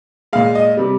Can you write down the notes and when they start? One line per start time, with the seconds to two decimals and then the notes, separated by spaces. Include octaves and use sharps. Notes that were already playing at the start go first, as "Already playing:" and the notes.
0.33 A#2 G#3 F5
0.55 D#5
0.77 C3 G3